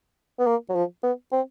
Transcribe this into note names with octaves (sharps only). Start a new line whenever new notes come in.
B3
A#3
F#3
F3
B3
C4